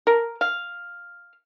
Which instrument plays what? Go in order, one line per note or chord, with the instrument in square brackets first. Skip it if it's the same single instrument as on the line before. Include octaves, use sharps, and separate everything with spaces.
[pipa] A#4
F5